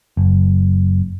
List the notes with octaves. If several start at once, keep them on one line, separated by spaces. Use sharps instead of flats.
F#1